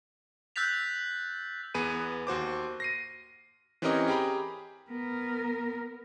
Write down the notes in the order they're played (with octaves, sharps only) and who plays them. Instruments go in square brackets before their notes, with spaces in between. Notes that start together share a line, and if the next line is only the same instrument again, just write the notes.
[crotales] E6 F#6 G6 A6 B6 F7
[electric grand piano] E2 B3 G#4 B4 D#7
D#2 F#4 C5 D6
A#6 C7 D#7
E3 C4 C#4 G4 A#4 D#5
G4 G#4 G5 A#5 B5
[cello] B3 A#4